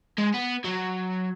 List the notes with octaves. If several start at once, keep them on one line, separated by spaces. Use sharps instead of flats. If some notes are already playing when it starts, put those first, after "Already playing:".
G#3
B3
F#3